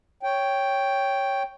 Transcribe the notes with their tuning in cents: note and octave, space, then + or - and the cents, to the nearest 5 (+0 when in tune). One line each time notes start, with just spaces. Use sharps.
C#5 +0 G5 +0